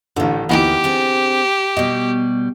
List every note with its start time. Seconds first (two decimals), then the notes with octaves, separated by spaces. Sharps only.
0.16 A1 A2 D3 D#3
0.49 D2 E3 A#3 B3 D#4 G4 B4
0.84 C4 D4 G#4
1.77 B2 G3 D#5